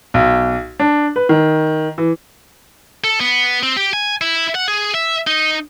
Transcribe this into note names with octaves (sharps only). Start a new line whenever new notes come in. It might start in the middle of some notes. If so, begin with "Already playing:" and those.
B1
D4
B4
D#3
E3
A4
B3
C4
G4
G#5
E4
F#5
G#4
E5
D#4